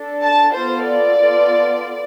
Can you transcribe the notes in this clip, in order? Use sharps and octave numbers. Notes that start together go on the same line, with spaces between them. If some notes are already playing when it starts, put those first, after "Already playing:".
Already playing: D4 A4
A5
B3 F4 A4 C5
D5
B3 F4 A4